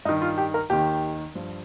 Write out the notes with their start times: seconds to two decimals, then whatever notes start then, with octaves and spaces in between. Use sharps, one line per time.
0.05 G2 D#4
0.09 D#3
0.22 F4
0.38 G4
0.54 A#4
0.70 D#2 D#3 G4
1.35 G2 F3